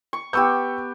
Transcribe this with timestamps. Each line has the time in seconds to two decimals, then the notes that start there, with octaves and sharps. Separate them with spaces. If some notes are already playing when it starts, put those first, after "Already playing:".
0.13 C#6
0.33 B3 G4 C#6 E6 G6